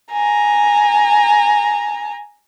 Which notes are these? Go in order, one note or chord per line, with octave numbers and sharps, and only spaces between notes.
G#5 A#5